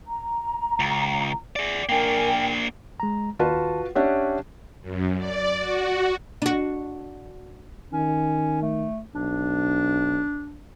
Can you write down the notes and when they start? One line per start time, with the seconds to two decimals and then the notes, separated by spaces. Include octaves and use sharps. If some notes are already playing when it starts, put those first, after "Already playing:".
0.07 A#5
0.80 C#2
1.56 G#4 D5
1.89 A#3 D4 A#4 G5 G#5
3.00 G#3 A#5
3.39 D#2 F4 F#4 B4 A5
3.95 C#4 D4 G4 C#5 E5 F#5
4.81 F#2
5.18 D5
5.58 F#4
6.42 D4 F#4
7.93 D#3 C#4
8.62 A3
9.15 B1 D4